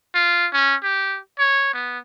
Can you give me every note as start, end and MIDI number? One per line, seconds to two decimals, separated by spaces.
0.15 0.47 65
0.53 0.76 61
0.83 1.18 67
1.39 1.71 73
1.73 1.99 59